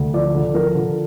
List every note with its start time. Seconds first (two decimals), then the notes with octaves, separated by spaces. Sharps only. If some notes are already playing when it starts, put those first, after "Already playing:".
Already playing: D2
0.14 F3 D5
0.34 D3
0.54 F3 A#4
0.75 D3